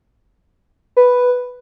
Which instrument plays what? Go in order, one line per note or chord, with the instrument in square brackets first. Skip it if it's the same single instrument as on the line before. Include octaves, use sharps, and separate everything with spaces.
[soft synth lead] B4